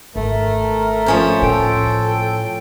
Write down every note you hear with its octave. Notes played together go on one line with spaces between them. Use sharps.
G#1 A3 A#4
F3 C#4 C5
A2 A4 G5